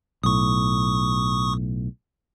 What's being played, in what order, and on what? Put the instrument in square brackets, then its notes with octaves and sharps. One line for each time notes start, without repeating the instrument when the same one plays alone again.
[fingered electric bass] B1 A2 [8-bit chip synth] C#6 D#6